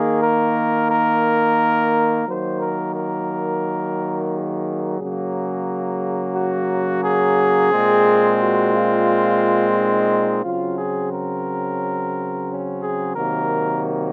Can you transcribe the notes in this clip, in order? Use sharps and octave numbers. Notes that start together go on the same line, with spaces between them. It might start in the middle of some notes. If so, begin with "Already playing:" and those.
Already playing: D#3 A#3 G#4
A#4
A#4
D#3 F#3 A#3 C5
A#4
A#4
G#4
C#3 F#3 A#3
F#4
G#4
A#2 G#3 C4
F#4
F4
D#4
C#3 F#3 C4 F4
G#4
A#4
C#4
G#4
C3 D#3 F#3 A#3 A#4